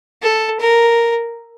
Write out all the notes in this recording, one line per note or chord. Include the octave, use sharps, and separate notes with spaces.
A4
A#4